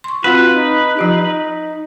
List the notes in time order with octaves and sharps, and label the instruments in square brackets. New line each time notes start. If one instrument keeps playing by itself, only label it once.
[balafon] C6 C#6
[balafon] C4 F#4 F#5 [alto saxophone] F4 [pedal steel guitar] B4
[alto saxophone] D#4
[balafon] F3 F4 G4 [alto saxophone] D#4